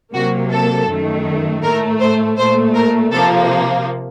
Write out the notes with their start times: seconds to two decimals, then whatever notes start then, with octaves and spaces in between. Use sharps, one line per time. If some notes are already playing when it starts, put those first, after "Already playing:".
0.13 C3 F#3 A#3 F#4
0.50 A4
0.88 F#2 D#3 A3
1.62 A2 A3 A#4
2.00 C5
2.37 A#2 A3 C5
2.73 A#4
3.11 C3 F3 A#3 A4